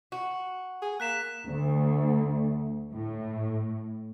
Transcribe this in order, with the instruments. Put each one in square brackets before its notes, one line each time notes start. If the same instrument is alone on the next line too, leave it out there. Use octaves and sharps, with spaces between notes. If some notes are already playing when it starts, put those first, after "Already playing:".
[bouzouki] F#4
[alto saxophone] G#4
[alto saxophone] A#3 [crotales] F#6 B6 E7
[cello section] D2
A2